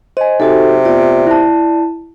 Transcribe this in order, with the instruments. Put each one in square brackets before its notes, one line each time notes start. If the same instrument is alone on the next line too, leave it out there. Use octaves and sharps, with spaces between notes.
[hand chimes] C5 G#5 [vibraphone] D#5
[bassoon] C3 [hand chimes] D#4 [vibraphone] F#4 A4
[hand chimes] B3 F4 [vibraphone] D5
[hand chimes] E4 A5